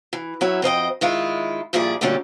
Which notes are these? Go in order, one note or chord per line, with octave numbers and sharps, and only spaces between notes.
E3
F#3 C#4 E4 E5
F2 C5 D#5 G5
D#3 G#3 E4 F4
G2 A#2 F3 E4 G#4 D5
D2 G2 A#2 D3 G3 C#4